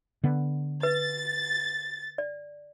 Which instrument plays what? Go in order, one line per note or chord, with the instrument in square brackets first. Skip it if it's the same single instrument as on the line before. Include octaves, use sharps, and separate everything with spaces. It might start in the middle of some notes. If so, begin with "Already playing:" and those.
[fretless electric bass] D3 B3
[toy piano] B4 [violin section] A6
[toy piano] D5